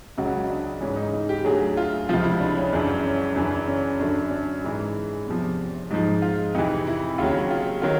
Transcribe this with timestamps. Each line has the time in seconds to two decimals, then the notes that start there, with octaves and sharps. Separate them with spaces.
0.17 C#2 C#3 F#3 F#4
0.50 D4
0.81 G#2 E3 C#4
0.97 D#4
1.13 D#4
1.29 G4
1.45 D2 D3 F#3 G#4
1.77 F4
2.09 C#2 C3 F3 F4
2.24 E4
2.40 D4
2.57 C#4
2.72 F#2 C#3 E3 D4
3.05 C#4
3.36 F#2 C#3 E3 D4
3.67 C#4
3.99 F#2 D3 F#3 D4
4.31 D4
4.64 G#2 E3
5.27 E2 C3 F3
5.91 G#2 F3 D#4
6.22 F4
6.55 F2 C3 E3 D#4
6.87 E4
7.18 D#2 C#3 F#3 F4
7.51 F4
7.82 D#3 F#3 F4